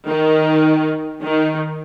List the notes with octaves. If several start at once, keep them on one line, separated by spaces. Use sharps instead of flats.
D#3
D#3